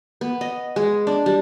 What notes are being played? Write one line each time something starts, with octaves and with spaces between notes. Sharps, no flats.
B3
D#5
G#3
D4
G3